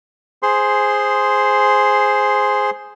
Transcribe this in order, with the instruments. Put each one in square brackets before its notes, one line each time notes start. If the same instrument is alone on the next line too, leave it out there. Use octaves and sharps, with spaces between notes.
[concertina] G#4 C5 C6